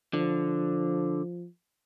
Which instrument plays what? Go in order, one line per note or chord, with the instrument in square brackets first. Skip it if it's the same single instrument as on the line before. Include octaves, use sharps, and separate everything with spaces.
[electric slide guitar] D3 [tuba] F3